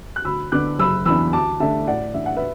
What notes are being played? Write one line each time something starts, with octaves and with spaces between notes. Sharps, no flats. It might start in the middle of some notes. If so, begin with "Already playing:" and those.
F#6
D2 B5 E6
D3 B3 D4 D6 F#6
F#1 B5 E6
E2 E3 D4 B5 E6
D2 A5 D6
D3 A3 D4 E5 A5
A2 D5 F#5
E3 D4 E5
F#5
B4 E5